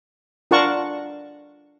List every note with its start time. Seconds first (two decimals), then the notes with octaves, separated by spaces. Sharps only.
0.51 D4 F4 A#4 F#5 A5 C#6